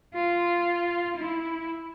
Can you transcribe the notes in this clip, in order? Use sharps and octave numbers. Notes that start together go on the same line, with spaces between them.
F4
E4